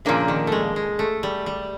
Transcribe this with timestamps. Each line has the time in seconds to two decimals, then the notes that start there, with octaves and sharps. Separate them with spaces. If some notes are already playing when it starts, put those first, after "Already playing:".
0.05 A#2 C#3 F3 A#3 D4
0.28 D#3
0.47 G#3 A3
0.76 G#3
0.99 A3
1.23 G3
1.46 G3